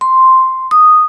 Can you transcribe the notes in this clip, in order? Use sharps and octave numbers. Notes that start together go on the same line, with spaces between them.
C6
D#6